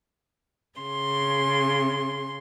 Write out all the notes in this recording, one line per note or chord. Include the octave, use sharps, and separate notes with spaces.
C#3 C6